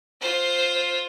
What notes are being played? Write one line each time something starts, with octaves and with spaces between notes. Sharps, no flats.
F4 C5